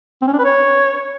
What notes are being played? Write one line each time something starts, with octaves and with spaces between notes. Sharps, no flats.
C4
C#4
D4
B4
C#5